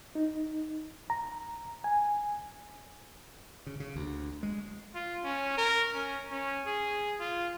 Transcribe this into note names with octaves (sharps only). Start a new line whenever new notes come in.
D#4
A#5
G#5
C#3
C#3
D2
G#3
F4
C#4
A#4
C#4
C#4
G#4
F4